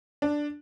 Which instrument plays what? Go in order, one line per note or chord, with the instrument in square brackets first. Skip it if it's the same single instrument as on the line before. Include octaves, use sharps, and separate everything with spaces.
[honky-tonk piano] D4